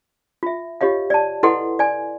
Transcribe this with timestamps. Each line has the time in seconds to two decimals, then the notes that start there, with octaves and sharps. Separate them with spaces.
0.43 F4 E5
0.81 F4 G4 C#5 D#5 F5
1.10 D5 A5
1.43 E4 A4 B4 D#5 F#5 C6
1.79 D5 G#5